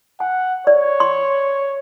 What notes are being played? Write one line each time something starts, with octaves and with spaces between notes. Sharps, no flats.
F#5 G#5
C#5 D5
C6